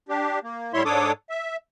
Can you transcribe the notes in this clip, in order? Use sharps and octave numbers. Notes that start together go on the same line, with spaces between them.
D4 G4
A#3
A2 G3 E4 C#5 E5 C6
G#2 D4 A4 C#5 D6 D#6
E5